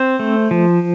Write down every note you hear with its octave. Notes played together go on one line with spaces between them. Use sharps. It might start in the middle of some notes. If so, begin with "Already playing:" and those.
Already playing: C4 C5
A3
F3